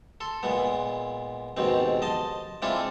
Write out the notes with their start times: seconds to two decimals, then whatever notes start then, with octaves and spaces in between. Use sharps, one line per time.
0.20 A4 C6
0.43 A#2 G#3 B3
1.57 D#2 G#2 B2 C4
2.02 D#5 A5 C6
2.62 G#3 C4 D4 E4 F4 A4